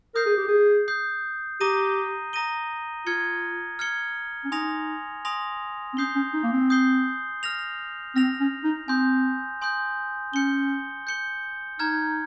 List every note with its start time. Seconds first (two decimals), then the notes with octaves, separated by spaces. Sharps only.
0.15 A#4 D#6 G6 C7
0.26 G#4
0.37 G4
0.48 G#4
0.88 D#6 G6 C7
1.61 G4 A#5 D#6 A#6 D#7 G7
2.33 A#5 D#6 A#6 D#7 G7
3.06 F4 F6 G#6 C#7 G7
3.79 F6 G#6 C#7 G7
4.44 C#4
4.51 D#4 G#5 C6 D#6 A#6 F7
5.25 G#5 C6 D#6 A#6 F7
5.93 C4
5.97 C#4 D#6 G6 C7 G7
6.15 C#4
6.34 D#4
6.43 A#3
6.53 C4
6.70 D#6 G6 C7 G7
7.43 F6 A#6 F7
8.15 C4 F6 A#6 F7
8.40 C#4
8.64 D#4
8.88 C4 G#5 C6 D#6 G6
9.62 G#5 C6 D#6 G6
10.34 C#4 G6 C#7 G7
11.07 G6 C#7 G7
11.79 D#4 A#5 F6 G#6